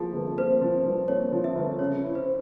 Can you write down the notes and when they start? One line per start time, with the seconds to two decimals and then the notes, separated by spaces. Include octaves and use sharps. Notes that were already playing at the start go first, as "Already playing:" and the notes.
Already playing: F3 A#3 G#4
0.13 G1
0.37 A#3 C5
0.61 F3
0.85 G2
1.08 A#3 C#5
1.32 F3
1.44 E5
1.55 G1
1.79 C#3 C#5
2.03 E4
2.15 C5